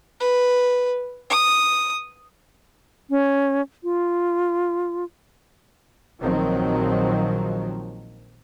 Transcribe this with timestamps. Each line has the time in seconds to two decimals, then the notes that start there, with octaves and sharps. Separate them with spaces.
0.20 B4
1.30 D#6
3.10 C#4
3.84 F4
6.21 A#1 D#3 F3 F#3 C4